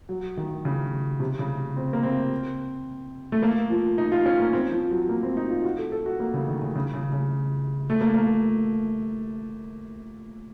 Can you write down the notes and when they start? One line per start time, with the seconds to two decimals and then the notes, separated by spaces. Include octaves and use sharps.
0.09 F#3
0.37 D#3
0.65 C#3
1.20 C3
1.39 C#3
1.76 C4
1.93 A#3
2.03 C4
3.32 A3
3.42 A#3
3.70 F3
3.98 D#4
4.12 F4
4.26 C#4
4.40 A#3
4.53 C4
4.72 F3
4.91 F#3
5.09 A#3
5.23 C4
5.37 D#4
5.50 F4
5.64 F#4
5.78 A4
5.92 A4
6.06 F#4
6.20 A#3
6.34 C#3
6.48 D#3
6.62 C#3
6.76 C#3
6.94 C#3
7.12 C#3
7.90 A3
8.01 A#3
8.14 A#3